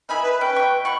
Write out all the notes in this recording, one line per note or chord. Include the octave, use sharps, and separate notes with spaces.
D#3 E4 G#4 B5
B4
C#4 G5
B2 C#6
B2 B4 F#5 C#6